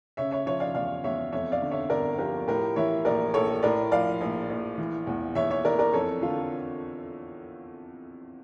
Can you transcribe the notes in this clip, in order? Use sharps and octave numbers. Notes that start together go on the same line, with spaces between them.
C#3 C#5 E5
C#5 E5
F3 C#5 E5
D5 F5
E2 D5 F5
E2 C#5 E5
F2 C#5 E5
D5 F5
D3
C#5 E5
G1 A#4 D5
F3 G4 A#4
A2 G4 A#4
E3 C#5 E5
A#1 A#4 D5
A#1 A4 C#5
A2 A#4 D5
F3 D5 F5
A#1
A#1
E3
E2
E2 C#5 E5
C#5 E5
E3 A#4 D5
A#4 D5
F2 A4 C#5
D3 F4 A4